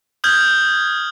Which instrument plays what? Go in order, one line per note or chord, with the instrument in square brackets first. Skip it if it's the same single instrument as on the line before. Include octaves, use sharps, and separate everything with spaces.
[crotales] D#6 F6 G6 G#6 F#7